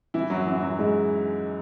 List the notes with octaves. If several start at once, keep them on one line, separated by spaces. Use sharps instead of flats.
E3 E4
F#2 F#3
E3
F#2 F#3
G#2 G#3